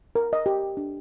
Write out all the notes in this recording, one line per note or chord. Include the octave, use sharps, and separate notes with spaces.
A#4
D#5
G4
D4